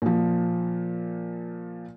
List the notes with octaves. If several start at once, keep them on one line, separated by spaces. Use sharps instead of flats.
A#2 F3